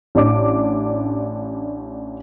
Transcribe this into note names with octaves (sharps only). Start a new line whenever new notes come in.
A1 D4 D6